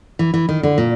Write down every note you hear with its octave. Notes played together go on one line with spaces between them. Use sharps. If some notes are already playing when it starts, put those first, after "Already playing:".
E3
E3
D#3
D3
A#2